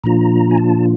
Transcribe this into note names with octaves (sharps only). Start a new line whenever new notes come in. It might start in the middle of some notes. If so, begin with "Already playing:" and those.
A#2 F3 A#3 D4 F4 A#5
G#5
A5